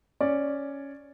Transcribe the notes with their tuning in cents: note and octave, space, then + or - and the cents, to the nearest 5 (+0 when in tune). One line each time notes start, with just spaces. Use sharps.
C#4 +0 D5 +0